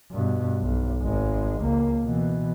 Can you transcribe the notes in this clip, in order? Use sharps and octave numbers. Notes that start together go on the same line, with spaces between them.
G2 B2
B1
G#1 G#3
C#2 A#3
B2 E3